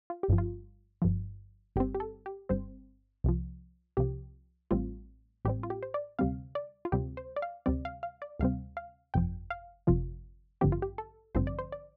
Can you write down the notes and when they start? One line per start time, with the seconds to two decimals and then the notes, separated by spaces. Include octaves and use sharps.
0.10 F4
0.23 G4
0.28 G1 G2 F3
0.38 F4
1.02 G1 G2 F3
1.76 G1 G2 G3 C4 G4
1.95 G4
2.00 A4
2.26 G4
2.49 G1 G2 G3 C4 C5
3.24 C2 C3 F3
3.97 C2 C3 F3 G4
4.71 A1 A2 G3 C4 F4
5.45 A1 A2 G3 C4 G4
5.63 F4
5.70 G4
5.83 C5
5.94 D5
6.19 D2 C3 G3 C4 F5
6.55 D5
6.85 F4
6.92 D2 C3 G3 C4 G4
7.17 C5
7.36 D5
7.42 F5
7.66 D2 C3 G3 C4 D5
7.85 F5
8.03 F5
8.22 D5
8.40 D2 C3 G3 C4 F5
8.77 F5
9.14 G1 F2 C3 F3 G5
9.50 F5
9.87 G1 F2 C3 F3 F4
10.61 A1 G2 D3 F3 C4 G4
10.72 F4
10.82 G4
10.98 A4
11.35 A1 G2 D3 F3 C4 C5
11.47 D5
11.59 C5
11.72 D5